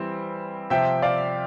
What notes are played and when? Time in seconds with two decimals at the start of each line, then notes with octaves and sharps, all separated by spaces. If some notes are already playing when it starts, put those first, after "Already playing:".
Already playing: E3 G3 C4
0.70 C3 F3 C4 E5 G5
1.02 D5 F5